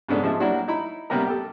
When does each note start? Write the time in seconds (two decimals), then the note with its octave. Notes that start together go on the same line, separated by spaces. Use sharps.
0.09 G#2 C#3 B3 D4 A4
0.23 G#2 F3 G#3 E5 A5
0.40 F#3 G3 A#3 D4 E4 F#4
0.68 D#4 E4 A#5 B5
1.10 C3 G3 A#3 B3 G4 A#4
1.27 G4 A4